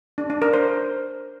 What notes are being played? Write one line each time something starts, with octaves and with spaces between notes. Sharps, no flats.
D4
D4
A#4
C5